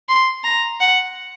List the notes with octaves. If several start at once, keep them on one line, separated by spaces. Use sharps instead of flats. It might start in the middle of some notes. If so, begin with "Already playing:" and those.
C6
A#5
F#5